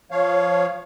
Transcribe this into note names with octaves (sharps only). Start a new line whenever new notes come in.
F3 C#5 F5